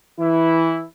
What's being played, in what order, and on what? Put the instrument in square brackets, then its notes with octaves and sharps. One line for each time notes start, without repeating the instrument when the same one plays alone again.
[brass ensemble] E3 E4